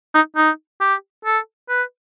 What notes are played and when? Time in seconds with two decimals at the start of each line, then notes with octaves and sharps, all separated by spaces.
0.15 D#4
0.37 D#4
0.81 G4
1.25 A4
1.69 B4